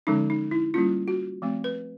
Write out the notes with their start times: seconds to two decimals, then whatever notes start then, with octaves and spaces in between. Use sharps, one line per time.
0.07 D3 F3 G#3 C#4 D#4
0.30 D#4
0.51 E4
0.74 G3 A#3 C#4 F4
1.08 F#4
1.42 F3 A3 C4
1.64 B4